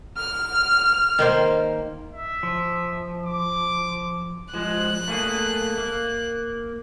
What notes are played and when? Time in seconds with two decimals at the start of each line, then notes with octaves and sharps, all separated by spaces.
0.17 F6
1.19 D#3 A#3 C5
2.12 E5
2.43 F3
3.26 D6
4.54 F3 G#3 F#6
5.08 A3 A#3 G#4
5.78 A#3